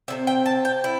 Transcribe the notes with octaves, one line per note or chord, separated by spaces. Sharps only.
C3 G3 C4 E5
G5
A5
G5
E4